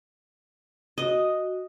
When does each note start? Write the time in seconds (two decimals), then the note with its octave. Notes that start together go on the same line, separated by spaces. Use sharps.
0.98 F#4 D#5